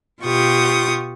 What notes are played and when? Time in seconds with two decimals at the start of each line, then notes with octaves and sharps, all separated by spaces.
0.23 B2 F4 G4 C#6 D#6